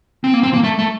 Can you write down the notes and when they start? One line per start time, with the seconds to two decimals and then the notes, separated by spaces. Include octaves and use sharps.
0.24 C4
0.34 A#3
0.43 C4
0.54 A#3
0.64 A3
0.79 A3